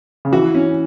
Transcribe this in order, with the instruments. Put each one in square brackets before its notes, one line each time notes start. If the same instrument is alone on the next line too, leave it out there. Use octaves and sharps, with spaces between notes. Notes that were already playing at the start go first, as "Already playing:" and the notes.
[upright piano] C#3
[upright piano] E3 [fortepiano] F#4
[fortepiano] C#4